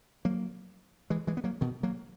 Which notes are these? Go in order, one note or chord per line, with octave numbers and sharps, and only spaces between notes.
F#3 A#3
E3 G#3
E3 G#3
B3
F#3 A#3
B2 D#3
F#3 A#3